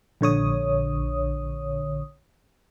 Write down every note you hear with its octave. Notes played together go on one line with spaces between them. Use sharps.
A#1 D3 C#5 D#6